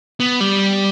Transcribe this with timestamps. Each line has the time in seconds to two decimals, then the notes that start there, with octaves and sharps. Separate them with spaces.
0.20 B3
0.40 G3